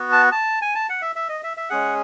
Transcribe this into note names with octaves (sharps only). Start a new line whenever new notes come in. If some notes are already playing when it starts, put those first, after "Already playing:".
Already playing: B3 F#4
A5
A5
G#5
A5
F#5
E5
E5
D#5
E5
E5
G#3 C#4 G#4 F#5